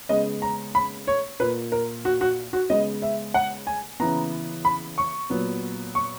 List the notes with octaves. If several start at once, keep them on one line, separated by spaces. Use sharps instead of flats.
C#3 G#3 B3 D#5
A#5
B5
C#5
A#2 A#3 B4
A#4
F#4
F#4
F#4
C#3 G#3 B3 D#5
E5
F#5
G#5
C#3 E3 B3 A#5
B5
C#6
A#2 F#3 B3
C#6